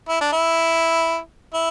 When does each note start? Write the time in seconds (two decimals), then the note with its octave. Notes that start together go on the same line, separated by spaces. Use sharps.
0.09 E4
0.21 D4
0.32 E4
1.54 E4